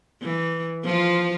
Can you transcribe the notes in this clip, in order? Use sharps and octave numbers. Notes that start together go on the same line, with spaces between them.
E3
F3 F4